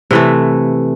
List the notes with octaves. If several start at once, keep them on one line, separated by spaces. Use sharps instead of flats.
C3 E3 A3